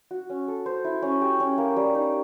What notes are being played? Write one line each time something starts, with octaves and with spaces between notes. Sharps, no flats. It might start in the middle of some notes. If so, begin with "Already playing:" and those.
F#4
C#4
A4
C5
E4
C#4
G4
C#4
A#3
G3
D#4